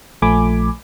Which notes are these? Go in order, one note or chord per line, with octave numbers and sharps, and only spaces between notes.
A#1 F3 A3 G#5 B5 D6